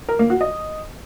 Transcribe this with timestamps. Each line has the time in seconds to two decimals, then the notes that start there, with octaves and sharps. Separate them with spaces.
0.09 A#4
0.19 A#3
0.30 F#4
0.41 D#5